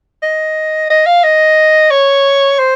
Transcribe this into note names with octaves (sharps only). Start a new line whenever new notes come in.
D#5
D#5
F5
D#5
C#5
C5